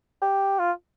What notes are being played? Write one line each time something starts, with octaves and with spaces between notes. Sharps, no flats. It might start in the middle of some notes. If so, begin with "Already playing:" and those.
G4
F4